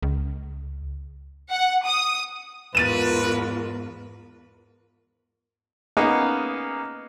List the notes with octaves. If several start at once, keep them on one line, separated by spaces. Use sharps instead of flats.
C#2
F#5
D#6
E2 G#2 F4 A#4 B4 A6 D#7 E7
A#3 B3 C#4 D#4 G#4